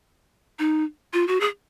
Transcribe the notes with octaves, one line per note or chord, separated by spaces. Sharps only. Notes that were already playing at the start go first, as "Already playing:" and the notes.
D#4
F4
F#4
G#4